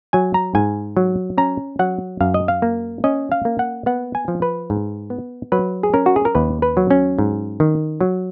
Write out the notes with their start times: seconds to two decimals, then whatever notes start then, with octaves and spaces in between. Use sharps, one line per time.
0.13 F#3 G#5
0.34 A#5
0.55 G#2 G#5
0.97 F#3
1.38 C#4 A#5
1.79 F#3 F#5
2.21 F#2 F5
2.34 D#5
2.48 F5
2.62 A#3
3.04 C#4 D#5
3.32 F5
3.45 A#3
3.59 F#5
3.86 B3 F#5
4.15 G#5
4.28 F3
4.42 B4
4.70 G#2
5.10 B3
5.52 F#3 B4
5.83 G#4
5.94 C#4 A#4
6.06 F#4
6.16 G#4
6.25 A#4
6.35 D#2 B4
6.62 B4
6.77 F#3
6.91 C#4
7.19 G#2
7.60 D#3
8.01 F#3